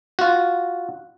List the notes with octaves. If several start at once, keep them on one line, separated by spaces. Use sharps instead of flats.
F4 F#4